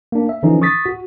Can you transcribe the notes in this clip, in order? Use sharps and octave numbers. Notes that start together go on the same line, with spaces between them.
A#3 D4
E5
D3 E3 F3 C#4 D#4
C#6 D#6 A6 B6
F#4